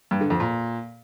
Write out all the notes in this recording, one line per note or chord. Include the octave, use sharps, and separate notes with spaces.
G2
D3
F2
A#2